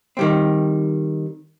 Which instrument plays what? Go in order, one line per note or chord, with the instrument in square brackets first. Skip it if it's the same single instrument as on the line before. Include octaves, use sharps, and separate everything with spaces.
[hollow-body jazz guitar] D#3 G3 C4